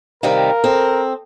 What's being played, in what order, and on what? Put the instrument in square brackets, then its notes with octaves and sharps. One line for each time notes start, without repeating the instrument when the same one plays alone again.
[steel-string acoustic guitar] C3 D#3 G3 [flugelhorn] A#4 [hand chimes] F5
[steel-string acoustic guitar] C4 [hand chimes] A4